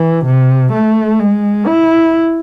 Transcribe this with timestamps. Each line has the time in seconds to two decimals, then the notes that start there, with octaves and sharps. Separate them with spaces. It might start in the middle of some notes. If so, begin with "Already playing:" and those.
Already playing: E3
0.26 C3
0.73 A3
1.20 G#3
1.66 E4